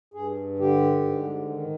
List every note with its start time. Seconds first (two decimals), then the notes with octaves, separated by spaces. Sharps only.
0.14 G2 G#4
0.59 D3 G4
1.04 G#2
1.49 D#3